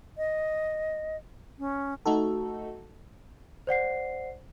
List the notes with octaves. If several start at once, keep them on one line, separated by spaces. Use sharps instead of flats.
D#5
C#4
A3 D#4 F#4 A4
C5 D5 F#5 C7